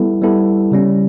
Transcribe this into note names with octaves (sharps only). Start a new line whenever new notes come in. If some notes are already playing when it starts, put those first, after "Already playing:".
Already playing: G3 B3 E4 A4
G3 B3 E4 A4
C#3 G3 C#4